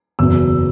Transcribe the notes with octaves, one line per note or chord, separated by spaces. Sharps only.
F#1 E2 B2 E6